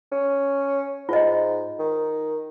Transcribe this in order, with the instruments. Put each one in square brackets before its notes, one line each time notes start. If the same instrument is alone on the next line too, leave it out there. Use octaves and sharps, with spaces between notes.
[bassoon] C#4
[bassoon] G#2 [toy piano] F4 D#5
[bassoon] D#3